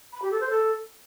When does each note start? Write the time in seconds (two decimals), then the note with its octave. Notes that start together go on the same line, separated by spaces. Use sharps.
0.13 B5
0.22 G4
0.31 A4
0.41 C5
0.50 A4